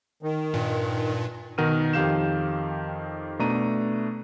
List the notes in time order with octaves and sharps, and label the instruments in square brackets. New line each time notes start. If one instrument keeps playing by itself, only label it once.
[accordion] D#3
[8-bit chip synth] G2 A#2
[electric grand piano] B2 D#3 A#4 F#5 F6 D#7
F2 D#3 G4 F5 G6 E7
B2 A3 D4 A#5 D#7